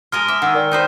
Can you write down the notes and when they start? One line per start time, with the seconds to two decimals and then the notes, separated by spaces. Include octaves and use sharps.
0.12 G#3 A#4 D#5 F6
0.28 E5 D6
0.42 D#3 F#5 E6
0.54 A#4 D5 G5
0.72 D#4 B4 C5